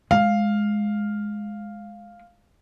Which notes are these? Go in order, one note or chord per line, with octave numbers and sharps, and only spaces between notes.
G#3 F5